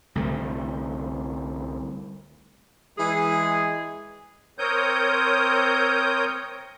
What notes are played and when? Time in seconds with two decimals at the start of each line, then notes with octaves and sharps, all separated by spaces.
0.15 C2 D3 A3
2.98 E3 G#3 G#4
4.59 C4 A#4 C#5 D#6 G6